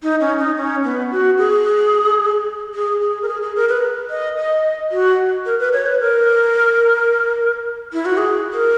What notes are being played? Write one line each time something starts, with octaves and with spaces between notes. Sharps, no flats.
D#4
C#4
D#4
C#4
B3
F#4
G#4
G#4
G#4
A#4
G#4
G#4
A#4
B4
D#5
D#5
F#4
A#4
B4
C#5
B4
A#4
E4
F#4
G#4
A#4